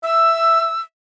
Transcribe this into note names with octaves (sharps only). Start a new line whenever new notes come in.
E5 E6